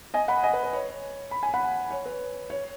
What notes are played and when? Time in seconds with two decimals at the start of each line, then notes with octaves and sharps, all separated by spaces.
0.14 D#5 G#5
0.28 F#5 B5
0.43 D#5 G#5
0.53 B4
0.63 B4
0.73 C#5
1.31 B5
1.43 G#5
1.54 F#5 B5
1.91 C#5
2.06 B4
2.50 C#5